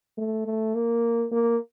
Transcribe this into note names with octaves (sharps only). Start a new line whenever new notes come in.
A3
A3
A#3
A#3